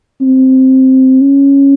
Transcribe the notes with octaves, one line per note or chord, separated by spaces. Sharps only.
C4
C#4